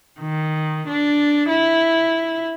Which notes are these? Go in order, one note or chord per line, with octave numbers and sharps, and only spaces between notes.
D#3
D4
E4